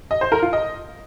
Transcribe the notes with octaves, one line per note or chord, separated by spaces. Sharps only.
D#5
C5
A#4
F4
D#5